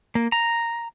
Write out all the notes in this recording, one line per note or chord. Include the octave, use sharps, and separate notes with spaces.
A#3
A#5